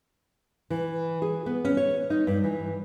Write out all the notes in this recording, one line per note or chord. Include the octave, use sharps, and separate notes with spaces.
E3
G#4
B3
C#4
C#5
D#4
G2
E3